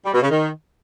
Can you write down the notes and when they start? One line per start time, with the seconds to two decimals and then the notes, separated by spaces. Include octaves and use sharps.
0.06 G3
0.14 B2
0.22 C#3
0.31 D#3